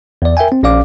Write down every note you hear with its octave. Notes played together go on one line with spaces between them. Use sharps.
E2 D5
A#4 E5 G5 G#5
C4
A#1 C#4 D5 F5 D6